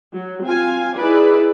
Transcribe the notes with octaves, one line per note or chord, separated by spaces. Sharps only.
F#3
C4 F4 F5 G#5
D#4 E4 G#4 B4 D5